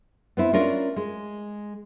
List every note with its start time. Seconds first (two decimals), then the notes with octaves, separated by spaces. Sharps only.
0.37 B3 C4 E4
0.53 C#4 D4 F4 A#4
0.96 G#3